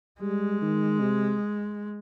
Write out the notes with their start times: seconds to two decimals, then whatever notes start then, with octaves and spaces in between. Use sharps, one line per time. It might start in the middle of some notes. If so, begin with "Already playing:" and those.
0.21 G3 G#3
0.61 D#3
1.00 C3